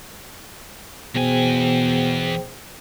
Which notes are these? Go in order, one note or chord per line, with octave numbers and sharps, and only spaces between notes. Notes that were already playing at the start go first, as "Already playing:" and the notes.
E2 B2 G#4 C5 G5 G#5